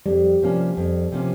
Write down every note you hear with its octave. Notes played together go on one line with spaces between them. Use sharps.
F2 G3
C3 F3 A#3 C#4
F2
C3 F3 A#3 C#4